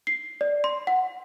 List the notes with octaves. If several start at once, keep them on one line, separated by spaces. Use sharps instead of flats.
C7
D5
C6
F#5